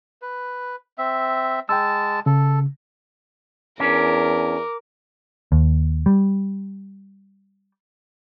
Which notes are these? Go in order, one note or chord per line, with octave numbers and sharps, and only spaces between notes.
B4
C4 E5
G#3 G5 A5 E6
C#3 A4
E2 C#4 D4 A#4 D6
D#2
G3